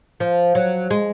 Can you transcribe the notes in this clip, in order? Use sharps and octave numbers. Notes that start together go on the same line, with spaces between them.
F3
F#3
G#3